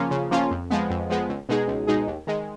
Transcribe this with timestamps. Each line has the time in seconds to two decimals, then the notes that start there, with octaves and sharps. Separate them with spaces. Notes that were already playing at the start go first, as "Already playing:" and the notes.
Already playing: C#3 F3 A#3 C#4 F4
0.11 C#3
0.31 F3 A#3 C#4 F4
0.51 F2
0.70 F3 G#3 B3
0.90 F2
1.10 F3 G#3 B3
1.29 C#2
1.49 B2 G#3 D#4 G#4
1.68 C#2
1.87 B2 G#3 D#4 G#4
2.07 D#2
2.27 D#3 G#3